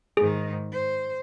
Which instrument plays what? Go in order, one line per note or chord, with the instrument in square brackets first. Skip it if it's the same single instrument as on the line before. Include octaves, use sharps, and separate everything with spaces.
[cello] G#2 D#3 [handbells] G#4
[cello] C5